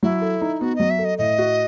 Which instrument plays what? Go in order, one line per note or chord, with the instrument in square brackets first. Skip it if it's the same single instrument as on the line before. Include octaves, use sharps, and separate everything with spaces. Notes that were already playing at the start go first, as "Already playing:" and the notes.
[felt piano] F#3 [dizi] E4
[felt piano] A4
D#4
[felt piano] B3 [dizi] F#4
[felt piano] F#3 [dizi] D#5
[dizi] E5
[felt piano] A4
[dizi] D#5
[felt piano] A2 [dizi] D#5
[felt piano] F#4